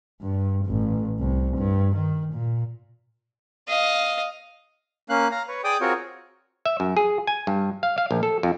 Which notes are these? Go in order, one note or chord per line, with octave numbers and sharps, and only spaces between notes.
G2
A1
C2
G2
D#3
A#2
D#5 F5
A#3 C#4 F5 F#6
F5 A#5
B4 C#5
G#4 D5 G5 D6 D#6
C4 F4 F#4 G#4 A#4 C#5
E5
F#2
G#4
G#5
G2
F5
F5
A#1
A4
F2